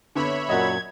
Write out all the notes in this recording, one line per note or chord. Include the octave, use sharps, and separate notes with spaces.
D3 B3 C#5 E5 B5
F#2 A#2 F#3 D#5 F#5 G#6